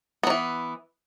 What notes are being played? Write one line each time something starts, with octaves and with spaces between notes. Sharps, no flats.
E3 F#3 B3